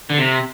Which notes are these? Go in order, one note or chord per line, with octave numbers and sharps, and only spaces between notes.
D3
C3